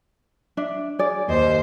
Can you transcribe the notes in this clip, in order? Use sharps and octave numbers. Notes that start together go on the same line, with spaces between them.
D4 E5
G#4 D5
D#2 C5 D#5